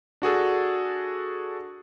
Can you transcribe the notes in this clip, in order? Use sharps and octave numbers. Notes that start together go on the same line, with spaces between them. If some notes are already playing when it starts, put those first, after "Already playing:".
D4 F#4 G#4 A4